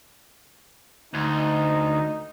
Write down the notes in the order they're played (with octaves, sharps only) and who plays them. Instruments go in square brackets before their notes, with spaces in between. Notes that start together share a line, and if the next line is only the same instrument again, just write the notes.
[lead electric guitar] D2 [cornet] D#4